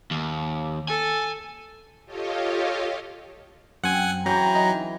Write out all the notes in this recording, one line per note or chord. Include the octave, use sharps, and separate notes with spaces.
D#2
A4 G#5
F4 G4 A4 C#5 D#5 F5
F#2 C4 F#5 G#5
C#3 E3 F#3 G5 A#5
D#4